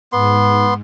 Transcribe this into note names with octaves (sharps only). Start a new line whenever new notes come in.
G#2 B3 C6